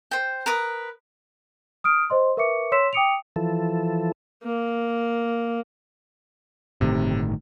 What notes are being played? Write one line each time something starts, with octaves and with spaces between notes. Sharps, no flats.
C5 G5
A#4 B4 D#6
D#6 F6 D7
C5 D#5 C6
A#4 B4 E5 C#6 D6 C#7
C#5 C6 E6 B6 E7
G5 D6 D#6 C#7 D7 F7
E3 F3 A4
A#3
G1 A2 C3 D#3